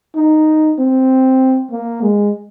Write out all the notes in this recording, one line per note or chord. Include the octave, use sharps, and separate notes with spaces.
D#4
C4
A#3
G#3